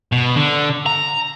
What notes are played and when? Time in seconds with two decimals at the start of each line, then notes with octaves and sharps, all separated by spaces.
0.12 B2
0.36 D3
0.87 A#5